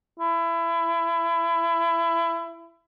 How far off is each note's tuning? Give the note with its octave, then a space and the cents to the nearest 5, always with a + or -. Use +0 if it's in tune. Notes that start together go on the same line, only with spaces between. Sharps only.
E4 +25